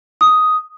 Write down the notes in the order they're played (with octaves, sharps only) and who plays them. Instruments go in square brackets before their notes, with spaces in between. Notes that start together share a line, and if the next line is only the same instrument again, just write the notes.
[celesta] D#6